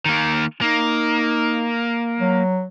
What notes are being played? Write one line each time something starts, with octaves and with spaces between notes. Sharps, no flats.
D#3 A#3
A#3 D#4
F#3